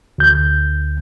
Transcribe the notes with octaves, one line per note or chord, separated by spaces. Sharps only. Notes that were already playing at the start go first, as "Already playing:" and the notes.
D2 G6